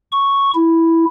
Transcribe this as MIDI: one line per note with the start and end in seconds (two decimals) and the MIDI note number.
0.12 0.51 85
0.54 1.05 64